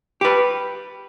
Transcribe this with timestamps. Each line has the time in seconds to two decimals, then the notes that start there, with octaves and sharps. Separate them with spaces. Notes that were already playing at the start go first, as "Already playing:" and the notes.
0.21 G4 B4